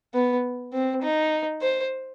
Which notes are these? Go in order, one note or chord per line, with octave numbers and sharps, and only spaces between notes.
B3
C4
D#4
C5